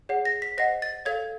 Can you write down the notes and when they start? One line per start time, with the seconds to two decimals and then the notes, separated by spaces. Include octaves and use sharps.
0.09 G#4 C#5 F#5
0.25 A#6
0.42 B6
0.58 C5 D#5 F#5 A#6
0.82 A6
1.06 A4 C#5 F5 G#6